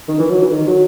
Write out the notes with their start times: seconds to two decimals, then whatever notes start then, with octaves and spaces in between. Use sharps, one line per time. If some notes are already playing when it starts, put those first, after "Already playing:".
0.08 D#3
0.20 E3
0.30 F#3
0.42 E3
0.52 D#3
0.67 F#3